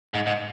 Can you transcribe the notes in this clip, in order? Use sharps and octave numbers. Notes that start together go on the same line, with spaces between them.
G#2
G#2